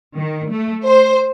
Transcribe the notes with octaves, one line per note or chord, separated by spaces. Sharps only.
D#3
A3
C5